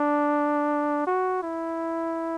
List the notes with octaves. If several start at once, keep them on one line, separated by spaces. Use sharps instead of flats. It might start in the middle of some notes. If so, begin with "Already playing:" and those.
Already playing: D4
F#4
E4